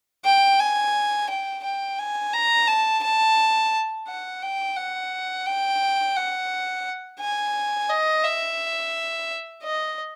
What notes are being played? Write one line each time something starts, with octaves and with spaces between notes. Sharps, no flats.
G5
G#5
G5
G5
G#5
A#5
A5
A5
F#5
G5
F#5
G5
F#5
G#5
D#5
E5
D#5